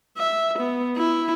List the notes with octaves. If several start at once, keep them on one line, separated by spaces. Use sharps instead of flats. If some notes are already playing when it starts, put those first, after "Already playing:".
E5
B3
E4